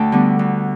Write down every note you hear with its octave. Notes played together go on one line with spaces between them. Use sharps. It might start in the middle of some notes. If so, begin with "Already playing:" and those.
Already playing: D2 A3 G5 A5
D3 G3 B3
D2